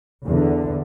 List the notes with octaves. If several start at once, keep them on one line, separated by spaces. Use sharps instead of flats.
E2 D3